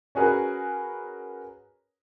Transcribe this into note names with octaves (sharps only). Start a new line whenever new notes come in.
C#4 F#4 G#4 A#4 B4